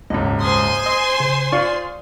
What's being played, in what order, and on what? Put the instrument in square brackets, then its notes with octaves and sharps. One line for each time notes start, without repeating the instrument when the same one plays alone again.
[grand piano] D#1 G#1 C#2 [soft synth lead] D#5
[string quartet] C5 G#5 C6 [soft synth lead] D#6
[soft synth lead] D#5 [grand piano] D#6
[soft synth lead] C#3
[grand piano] F4 F5 C#6 [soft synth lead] D5